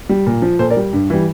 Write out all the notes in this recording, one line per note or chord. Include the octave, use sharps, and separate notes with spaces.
G3
A#2
F3
A#2 A4 C5
A#4 D5
G3
G2
E3 G3